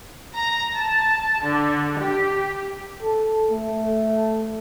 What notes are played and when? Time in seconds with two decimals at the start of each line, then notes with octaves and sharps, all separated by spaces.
0.36 A#5
0.75 A5
1.44 D3
2.00 G4
3.03 A4
3.51 A3